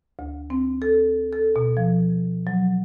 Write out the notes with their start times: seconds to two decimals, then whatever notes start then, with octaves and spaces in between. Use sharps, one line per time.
0.19 D2
0.50 C4
0.82 A4
1.33 A4
1.56 B2
1.77 F3
2.47 F#3